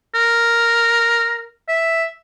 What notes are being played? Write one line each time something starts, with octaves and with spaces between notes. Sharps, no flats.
A#4
E5